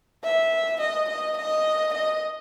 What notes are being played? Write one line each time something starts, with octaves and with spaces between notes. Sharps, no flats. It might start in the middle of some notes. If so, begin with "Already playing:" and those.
E5
D#5
D#5
D#5
D#5